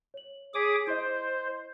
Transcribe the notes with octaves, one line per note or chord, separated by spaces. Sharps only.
C#5 F#7
G#4 C#5 D6 D#6 B6
E4 C5 D#5